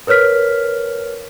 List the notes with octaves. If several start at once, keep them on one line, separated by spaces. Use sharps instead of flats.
A#4 B4 C#5 F6 B6